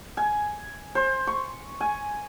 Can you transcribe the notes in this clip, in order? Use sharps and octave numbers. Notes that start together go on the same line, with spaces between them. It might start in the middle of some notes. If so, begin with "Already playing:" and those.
G#5
C5
C#6
G#5